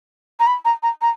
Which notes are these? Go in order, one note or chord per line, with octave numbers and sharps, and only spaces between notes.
A#5
B5
A#5
A#5
A#5